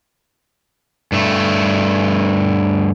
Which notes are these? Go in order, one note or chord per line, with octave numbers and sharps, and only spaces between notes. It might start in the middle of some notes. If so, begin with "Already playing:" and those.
G2 A3